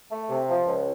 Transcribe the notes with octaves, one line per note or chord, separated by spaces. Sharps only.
A3
C3
F3
C#2